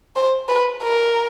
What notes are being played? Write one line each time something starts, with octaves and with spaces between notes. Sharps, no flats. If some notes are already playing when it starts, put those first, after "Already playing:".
C5
B4
A#4